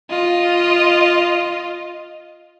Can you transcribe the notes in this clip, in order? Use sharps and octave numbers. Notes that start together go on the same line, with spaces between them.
F4 D#5